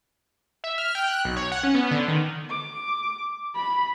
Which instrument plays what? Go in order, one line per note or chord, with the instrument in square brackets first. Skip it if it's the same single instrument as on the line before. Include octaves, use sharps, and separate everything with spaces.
[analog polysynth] E5
F6
G5
F#6
B1
C#5
F#5
C#4
B3
D3
D#3
[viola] D6
[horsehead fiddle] B5